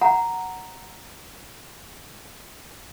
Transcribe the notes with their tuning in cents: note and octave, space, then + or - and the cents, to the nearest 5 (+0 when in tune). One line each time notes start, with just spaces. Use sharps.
F#5 +0 A#5 +0